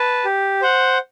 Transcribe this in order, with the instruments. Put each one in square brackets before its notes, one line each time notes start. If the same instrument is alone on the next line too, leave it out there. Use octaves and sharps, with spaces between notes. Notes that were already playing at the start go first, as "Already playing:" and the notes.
Already playing: [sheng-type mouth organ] B4 A5
G4
C5 F#5